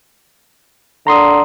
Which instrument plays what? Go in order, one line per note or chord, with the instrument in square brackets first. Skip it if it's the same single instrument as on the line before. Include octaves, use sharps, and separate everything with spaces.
[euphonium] D3 [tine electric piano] A#5 C6 D#6